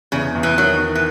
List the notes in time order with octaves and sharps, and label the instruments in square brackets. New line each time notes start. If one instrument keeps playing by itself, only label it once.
[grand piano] E2 [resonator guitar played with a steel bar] C#3
[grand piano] E2
[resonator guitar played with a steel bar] E3
[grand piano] D#3 [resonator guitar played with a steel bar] F#3
[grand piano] D#3
[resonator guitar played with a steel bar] E3